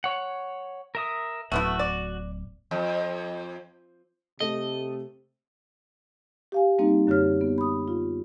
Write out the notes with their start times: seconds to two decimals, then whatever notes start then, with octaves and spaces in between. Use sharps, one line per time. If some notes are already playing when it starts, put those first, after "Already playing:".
0.04 C#5 F#5
0.95 A#4 E5 D#6
1.52 D1 A3 B3 E4 F#4
1.79 D5
2.71 F2
4.40 C3 A3 A4 D#5
6.52 G4 F5 G#5
6.78 G3 A#3 C4 D#4
7.07 F#2 D3 G4 C#5 F6
7.41 B3
7.58 B5 D#6
7.88 F4